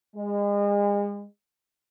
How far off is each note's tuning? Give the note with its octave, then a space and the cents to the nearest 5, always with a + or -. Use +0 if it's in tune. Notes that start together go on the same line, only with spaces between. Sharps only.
G#3 -35